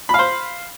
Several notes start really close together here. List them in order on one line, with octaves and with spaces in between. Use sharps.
B5 F5 C5